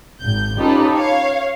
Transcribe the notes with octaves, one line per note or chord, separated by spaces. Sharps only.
G#1 G6
C#4 D#4 F4 G4 A4 B4
C#5 F5